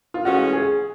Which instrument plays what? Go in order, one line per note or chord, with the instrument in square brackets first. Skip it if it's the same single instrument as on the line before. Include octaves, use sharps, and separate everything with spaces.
[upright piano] F4
[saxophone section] A2 E3 G#3 C#4 [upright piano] F#4
[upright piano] G#4